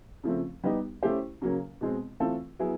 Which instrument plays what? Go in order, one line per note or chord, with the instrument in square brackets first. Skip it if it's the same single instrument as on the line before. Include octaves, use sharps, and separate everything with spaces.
[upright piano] C#3 F3 A3 C4
G3 B3 D#4 G4
A3 C#4 E4 G4 C5
C#3 F#3 A#3 C#4
B2 G#3 C4
E3 A3 C4 F4 A4
F#3 B3 E4 G#4